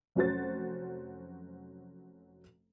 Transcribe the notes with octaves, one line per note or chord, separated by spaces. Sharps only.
F1 F#3 C#4 F#4 C5 A6